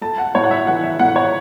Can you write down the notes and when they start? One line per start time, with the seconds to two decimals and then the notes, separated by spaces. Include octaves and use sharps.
0.01 A3 A5
0.18 F#5
0.35 A2 C#5
0.44 F#5
0.51 E5
0.67 E3 F#5
0.84 E5
0.99 A2 F#5
1.16 C#5